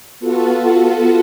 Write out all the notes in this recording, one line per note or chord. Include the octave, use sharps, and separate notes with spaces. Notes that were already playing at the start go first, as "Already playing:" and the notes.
B3 F4 F#4 A4